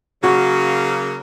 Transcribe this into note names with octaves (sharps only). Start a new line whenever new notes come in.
C#3 F#3 A#3 F#4